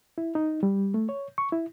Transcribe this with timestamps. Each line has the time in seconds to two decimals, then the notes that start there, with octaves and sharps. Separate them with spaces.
0.18 E4
0.35 D#4
0.63 G3
0.94 A3
1.09 C#5
1.38 C#6
1.52 E4